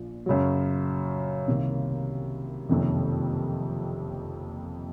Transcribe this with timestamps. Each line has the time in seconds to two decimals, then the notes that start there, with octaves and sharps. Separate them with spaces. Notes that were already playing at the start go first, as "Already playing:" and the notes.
Already playing: A#1 A#2 F3
0.26 F#2 C#3 F#3
1.48 C2 C3 D#3 A#3
2.69 F#1 F2 C3 D#3